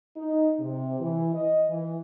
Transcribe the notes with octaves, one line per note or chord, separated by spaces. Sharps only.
D#4
C3
E3
D#5
E3